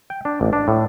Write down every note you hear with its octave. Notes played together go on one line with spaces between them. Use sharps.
G5
D4
A1
D4
A2